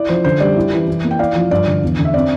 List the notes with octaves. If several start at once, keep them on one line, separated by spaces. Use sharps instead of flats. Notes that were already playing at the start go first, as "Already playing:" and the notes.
Already playing: E4 D5
F3 C5
D3 C5
G3 D5
E4
E3
E3
A#3
G5
E4 D5 F5
F3
G2 D5
D3
E2
D3
E5
C4 D5